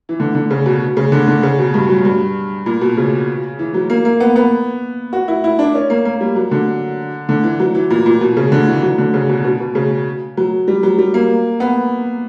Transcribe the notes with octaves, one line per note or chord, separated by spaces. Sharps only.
E3
D3
D3
C#3
B2
C#3
D3
D3
C#3
B2
G2
F#3
G2
A#2
B2
C#3
E3
F#3
A#3
A#3
B3
B3
F#4
E4
E4
D4
C#4
A#3
A#3
G3
F#3
D3
D3
E3
F#3
E3
A#2
A#2
B2
C#3
D3
E3
F#3
D3
C#3
B2
B2
B2
C#3
F#3
G3
F#3
G3
A#3
B3